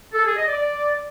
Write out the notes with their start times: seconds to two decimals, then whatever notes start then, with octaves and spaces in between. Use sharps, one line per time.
0.14 A4
0.25 G#4
0.36 D#5
0.47 D5